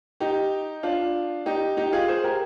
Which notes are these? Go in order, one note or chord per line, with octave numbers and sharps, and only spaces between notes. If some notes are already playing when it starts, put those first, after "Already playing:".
D#4 G4
D4 F4
D#4 G4
D#4 G4
F4 G#4
G#4 C5
G4 A#4